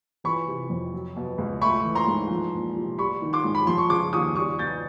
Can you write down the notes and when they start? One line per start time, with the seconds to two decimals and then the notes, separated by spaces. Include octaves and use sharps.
0.24 E3 B5 C#6
0.48 C3
0.70 F2
0.94 F#3
1.16 B2
1.38 C#2
1.61 A3 B5 C#6
1.84 E3
1.95 A#5 C6
2.07 G#2
2.30 F3
2.54 A#2
2.76 C2
2.98 G3 B5 C#6
3.22 D#3
3.33 C6 D6
3.44 G#2
3.55 B5
3.67 F3 C6
3.78 C#6
3.90 C#3 C6 D6
4.13 D#2 C#6 D#6
4.35 G3 C#6 D#6
4.58 B2 G6 A6